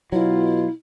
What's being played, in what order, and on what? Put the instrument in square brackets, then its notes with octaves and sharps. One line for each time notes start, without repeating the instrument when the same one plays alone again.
[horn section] B2 F4 [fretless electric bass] F#3 [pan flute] E4